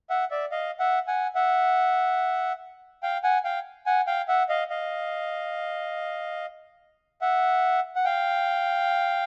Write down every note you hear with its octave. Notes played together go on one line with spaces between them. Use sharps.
E5 F#5
D5 E5
D#5 F5
E5 F#5
F#5 G#5
E5 F#5
F5 G5
F#5 G#5
F5 G5
F#5 G#5
F5 G5
E5 F#5
D#5 F5
D#5 F5
E5 F#5
F#5
F5 G5